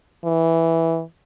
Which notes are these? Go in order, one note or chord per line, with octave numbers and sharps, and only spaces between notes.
E3